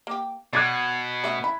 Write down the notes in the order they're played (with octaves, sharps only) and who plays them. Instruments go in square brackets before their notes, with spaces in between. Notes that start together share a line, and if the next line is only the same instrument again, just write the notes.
[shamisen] A#3 G4
[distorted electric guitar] B2 [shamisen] D5 [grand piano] F#6 G#6 A6
[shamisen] A3 C#4 E5
[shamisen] E4 [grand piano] B5